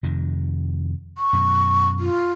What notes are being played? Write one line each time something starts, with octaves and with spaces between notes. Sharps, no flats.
F2 C3 D#3
C#6
F#2 B2
F4